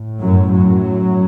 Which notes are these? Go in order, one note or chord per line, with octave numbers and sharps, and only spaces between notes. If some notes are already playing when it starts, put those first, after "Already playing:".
Already playing: A2
F#2 F#3
F#2 F#3